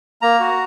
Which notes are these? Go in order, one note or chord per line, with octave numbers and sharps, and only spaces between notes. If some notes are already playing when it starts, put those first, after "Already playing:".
A#3 A#5
F#4